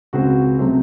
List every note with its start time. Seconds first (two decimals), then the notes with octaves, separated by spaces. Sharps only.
0.13 C#2 C#3 G#3 C4 F#4
0.59 C3 F#3 A3 C4